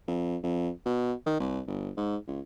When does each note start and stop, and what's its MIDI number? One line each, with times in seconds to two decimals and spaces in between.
0.08 0.37 41
0.43 0.70 41
0.85 1.13 47
1.26 1.39 51
1.40 1.61 36
1.67 1.90 31
1.97 2.17 44
2.27 2.40 37